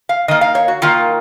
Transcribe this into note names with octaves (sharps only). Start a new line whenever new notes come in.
F5
D#3 A#3 D#5
F5
C#5
F#4
D#3 A#3 F4